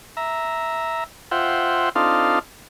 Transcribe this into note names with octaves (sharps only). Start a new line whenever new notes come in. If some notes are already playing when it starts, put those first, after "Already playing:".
E5 A#5
F4 C5 E5 F#5 G5
C4 D4 D#4 F4 A4 F5